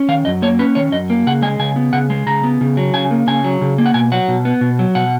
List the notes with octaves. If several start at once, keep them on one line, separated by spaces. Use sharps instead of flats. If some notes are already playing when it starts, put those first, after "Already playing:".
Already playing: C#4
D#3 F5
F#2 D#5
A#3 C#5
C#4 B4
D#3 C#5
F#2 D#5
A#3
C#3 F#5
G#3 G#5
C#3 G#5
B3
C#3 F#5
G#3
C#3 A#5
B3
C#3
F#3
C#3 G#5
A#3
C#3 G#5
F#3
C#3
A#3
F#5
B2 G#5
F#3 F#5
B2
B3
B2
F#3
B2 F#5